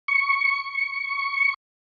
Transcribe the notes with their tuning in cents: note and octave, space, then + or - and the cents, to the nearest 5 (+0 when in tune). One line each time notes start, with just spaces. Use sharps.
C#6 +0